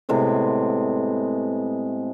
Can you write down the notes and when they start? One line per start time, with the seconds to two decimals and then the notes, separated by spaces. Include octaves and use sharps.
0.09 A2 C3 G#3 B3